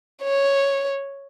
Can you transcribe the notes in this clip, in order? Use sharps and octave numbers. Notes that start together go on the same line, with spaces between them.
C#5